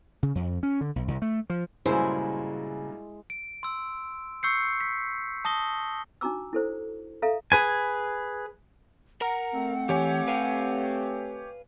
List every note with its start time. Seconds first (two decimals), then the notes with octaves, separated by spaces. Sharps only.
0.23 C#3
0.35 F2
0.63 C#4
0.81 D3
0.96 B1
1.08 C2
1.22 A3
1.50 F3
1.86 G2 A#2 C#3 F#3 G#3 E4 C5
3.30 D7
3.63 C6 E6
4.43 C#6 E6 G6 C7 C#7
4.80 B6
5.45 A5 D#6 A#6 G7
6.21 D4 D#4 F#4 A#5 D6 E6
6.53 E4 A4 C5
7.22 A4 E5 F5 A#5
7.52 G#4 B4 G#5
9.21 A#4 F#5 A#5
9.54 A3 C4
9.89 E3 G4 C#5 G#5
10.28 B4 F5